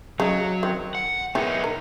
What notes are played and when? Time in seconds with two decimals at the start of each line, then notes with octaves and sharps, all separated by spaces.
0.20 C#3 F#3 D#4
0.63 D#3 C4
0.95 F#5
1.35 D#3 E3 G#3 B3 D#4
1.64 A#4